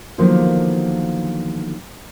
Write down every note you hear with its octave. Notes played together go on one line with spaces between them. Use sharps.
D3 D#3 F3 F#3 A#3 B3